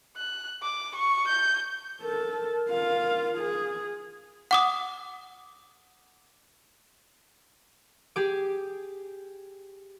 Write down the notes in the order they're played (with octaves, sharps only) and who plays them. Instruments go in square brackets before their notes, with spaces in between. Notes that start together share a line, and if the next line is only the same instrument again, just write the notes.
[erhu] F#6
D6
C#6
G6
[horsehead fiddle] A4 [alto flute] A#4
[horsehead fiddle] F4 F5
G#4
[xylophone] F#5 D6 D#6
[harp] G4 G#4 D6